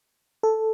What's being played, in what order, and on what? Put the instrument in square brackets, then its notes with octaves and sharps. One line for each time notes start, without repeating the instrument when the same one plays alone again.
[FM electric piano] A4